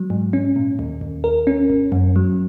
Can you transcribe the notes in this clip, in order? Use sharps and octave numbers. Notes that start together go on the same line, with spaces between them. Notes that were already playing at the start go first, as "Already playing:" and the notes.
Already playing: F#3
G#2
C#4
A#2
D#2
D#2
A#4
C#4
G#1
F#2
F#3